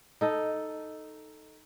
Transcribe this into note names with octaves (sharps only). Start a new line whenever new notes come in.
D#4 A4 D#5